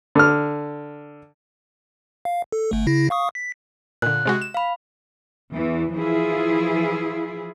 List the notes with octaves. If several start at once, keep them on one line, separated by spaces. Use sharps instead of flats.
D3 F6
F5
A4
G1 A3
C#3 E4 A#6
F5 C#6 D#6
B6
A#2 D3 F#6
C3 G#3 F#4
E7
F5 B5
E2 E3
E3 F3 E4 F4 G#4